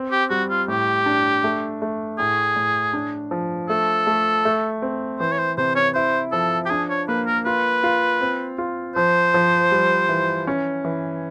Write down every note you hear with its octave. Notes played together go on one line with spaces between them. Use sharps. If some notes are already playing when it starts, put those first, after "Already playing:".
Already playing: C4
G4
G3 F#4
F4
A2 G4
D4
A3
A3
A2 G#4
A2
D4
F3
A3 A4
A3
A3
C4
E3 C5
C#5
C5
C3 C5
C#5
E4 C5
F3 A4
G4
D4 G#4
C#5
A#3 B4
A#4
F4 B4
F4
C4
F4
F3 C5
F3
G3
E3
C#4
E3